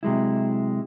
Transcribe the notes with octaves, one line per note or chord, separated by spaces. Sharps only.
C3 F#3 G#3 E4